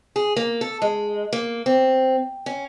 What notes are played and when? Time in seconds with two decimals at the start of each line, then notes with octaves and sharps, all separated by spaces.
0.16 G#4
0.36 A#3
0.61 A4
0.82 G#3
1.33 A#3
1.66 C4
2.46 C#4